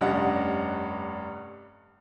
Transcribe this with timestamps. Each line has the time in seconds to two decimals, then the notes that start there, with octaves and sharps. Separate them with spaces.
0.01 F1 G2 C#4 D#5 F#5